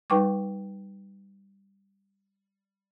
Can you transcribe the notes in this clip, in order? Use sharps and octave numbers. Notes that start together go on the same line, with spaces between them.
G3 D#4 B4 G5 C#6 D6